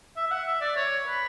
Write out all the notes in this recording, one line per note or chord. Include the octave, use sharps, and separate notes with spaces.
E5
E5
F#5
E5
D5
C#5
B4